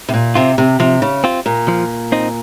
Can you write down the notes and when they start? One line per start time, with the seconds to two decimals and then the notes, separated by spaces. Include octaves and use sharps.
0.09 C3
0.14 A#2
0.35 C3 C4 F4
0.58 C3
0.80 C3 F3
1.02 C#3
1.24 C4 F4
1.46 A#2
1.68 F3
2.12 C4 D#4